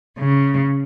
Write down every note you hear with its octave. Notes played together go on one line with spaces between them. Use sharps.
C#3